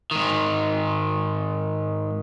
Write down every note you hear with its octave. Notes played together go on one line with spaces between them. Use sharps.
G#2 D#3